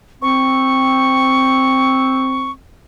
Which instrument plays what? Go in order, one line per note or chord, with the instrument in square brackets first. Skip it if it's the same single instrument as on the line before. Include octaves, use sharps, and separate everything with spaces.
[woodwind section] C4 [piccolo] C#6